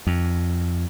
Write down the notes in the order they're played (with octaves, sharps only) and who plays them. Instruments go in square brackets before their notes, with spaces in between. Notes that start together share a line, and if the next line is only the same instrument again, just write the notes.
[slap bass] F2